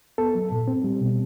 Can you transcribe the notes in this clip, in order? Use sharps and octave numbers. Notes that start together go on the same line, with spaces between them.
B3 A4
F#3
A#2
C4
G3
B2